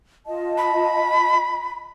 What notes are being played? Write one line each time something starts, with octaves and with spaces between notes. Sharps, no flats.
F4 D#5 A5
B5